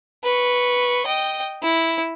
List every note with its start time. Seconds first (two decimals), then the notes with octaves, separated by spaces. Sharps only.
0.24 B4 C#6
1.07 D#5 G5
1.63 E4